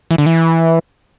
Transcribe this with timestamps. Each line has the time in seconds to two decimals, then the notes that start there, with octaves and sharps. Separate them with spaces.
0.11 E3
0.18 D3
0.26 E3